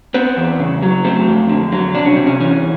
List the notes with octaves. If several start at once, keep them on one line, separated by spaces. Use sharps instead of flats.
B3 C4
E2
C#3
F#3
A3 C4
F2
D3
F#3
C3 D4
C#4
C3 C4
C#4
E3 C#4